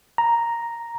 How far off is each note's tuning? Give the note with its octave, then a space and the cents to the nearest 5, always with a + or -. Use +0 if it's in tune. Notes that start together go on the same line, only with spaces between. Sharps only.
A#5 +0